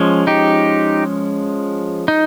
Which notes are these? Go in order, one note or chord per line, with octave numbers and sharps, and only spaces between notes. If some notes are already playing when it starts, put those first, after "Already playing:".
Already playing: F3 G#3 C#4
D#4 G4
D#4